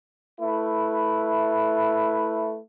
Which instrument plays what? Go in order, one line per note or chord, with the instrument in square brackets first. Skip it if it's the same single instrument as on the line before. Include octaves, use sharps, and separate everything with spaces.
[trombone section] A3 E4 B4